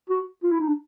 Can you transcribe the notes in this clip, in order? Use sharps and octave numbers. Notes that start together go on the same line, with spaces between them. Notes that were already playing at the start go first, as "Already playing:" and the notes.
F#4
F4
E4
D#4
D4